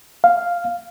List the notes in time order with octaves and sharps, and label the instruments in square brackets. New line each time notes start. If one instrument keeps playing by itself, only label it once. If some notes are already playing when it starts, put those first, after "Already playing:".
[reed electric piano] F5